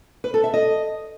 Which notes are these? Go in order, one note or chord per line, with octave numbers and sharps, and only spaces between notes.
B4
A4
E5
D#5